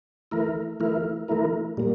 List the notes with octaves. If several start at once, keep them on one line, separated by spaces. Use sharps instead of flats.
E3 A3 E4 A#4
E3 A3 E4 A#4
E3 A3 E4 A#4
A#2 G3 A#3